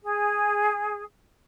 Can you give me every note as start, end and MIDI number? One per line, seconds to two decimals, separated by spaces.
0.03 1.02 68